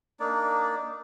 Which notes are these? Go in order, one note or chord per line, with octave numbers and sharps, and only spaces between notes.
A#3 D4 D#4 D5